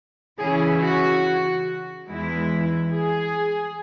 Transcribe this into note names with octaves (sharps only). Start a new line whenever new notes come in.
C#3 E3 C#4 E4 G#4
F#4
E2 E3 G#3 E4
G#4